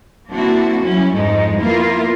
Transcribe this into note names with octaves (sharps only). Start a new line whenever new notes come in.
A#3 C4 D4 E4 F#4
F#3 G3 C#4 E4
F2 G#2 F3 G#3 A3 D#4
A#3 B3 E4 F4 A#4